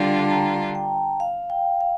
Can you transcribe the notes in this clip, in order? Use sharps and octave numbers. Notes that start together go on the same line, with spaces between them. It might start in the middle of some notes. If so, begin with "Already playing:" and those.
Already playing: D3 G3 D4 F4 G5 A5
A#5
G5
F5
G5
F5